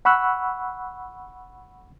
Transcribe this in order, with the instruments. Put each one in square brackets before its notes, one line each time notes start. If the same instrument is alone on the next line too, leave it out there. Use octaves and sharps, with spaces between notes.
[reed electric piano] F#5 B5 C#6 E6 F#6